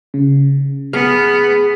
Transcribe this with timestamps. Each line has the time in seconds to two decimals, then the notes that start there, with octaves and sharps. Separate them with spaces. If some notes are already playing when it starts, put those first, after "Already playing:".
0.14 C#3
0.93 B3 G#4 F6